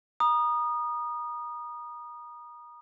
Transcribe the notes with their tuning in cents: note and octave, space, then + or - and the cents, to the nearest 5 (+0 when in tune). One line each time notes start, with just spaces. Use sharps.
A#5 +35 D#6 -20